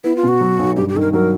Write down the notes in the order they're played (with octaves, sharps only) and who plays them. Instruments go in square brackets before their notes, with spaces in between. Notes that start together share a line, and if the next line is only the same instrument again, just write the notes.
[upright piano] B3 [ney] E4
[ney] F4
[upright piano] B2
[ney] F#4
[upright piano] F#3
B1
[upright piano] G2 [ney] G4
[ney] G4
[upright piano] D#3 [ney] A4
[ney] A#4
[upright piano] F#3 [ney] A#4